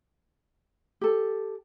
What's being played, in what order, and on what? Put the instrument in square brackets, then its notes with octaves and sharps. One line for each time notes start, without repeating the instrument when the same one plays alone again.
[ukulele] G4 A4